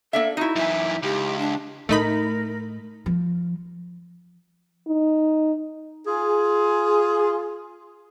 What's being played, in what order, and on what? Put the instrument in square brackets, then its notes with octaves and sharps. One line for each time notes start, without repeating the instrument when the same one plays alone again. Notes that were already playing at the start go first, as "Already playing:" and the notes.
[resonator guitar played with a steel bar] A#3 D4 E5 [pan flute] A4
[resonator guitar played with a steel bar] D#4 E4 [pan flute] F#4
[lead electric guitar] F#2 E3 [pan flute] E5
[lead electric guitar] C#2 [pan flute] G4
[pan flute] D4
[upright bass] A2 [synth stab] A3 D#4 B5 [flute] A#4
[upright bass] F3
[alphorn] D#4
[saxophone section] F4 G#4